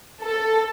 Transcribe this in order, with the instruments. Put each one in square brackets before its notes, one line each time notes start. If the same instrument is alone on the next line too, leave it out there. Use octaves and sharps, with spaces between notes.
[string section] A4